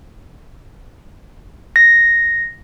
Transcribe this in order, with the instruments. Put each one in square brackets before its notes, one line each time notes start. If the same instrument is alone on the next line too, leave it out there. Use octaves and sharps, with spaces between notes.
[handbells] A#6